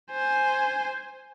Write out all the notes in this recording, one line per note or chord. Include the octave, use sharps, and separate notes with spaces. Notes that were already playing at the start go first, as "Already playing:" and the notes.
C5 G#5